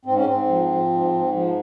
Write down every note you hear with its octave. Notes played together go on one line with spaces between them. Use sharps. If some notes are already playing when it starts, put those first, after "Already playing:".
G#2 C4
C#4
G#2 C4
F3
F3
G#2
G#2
F3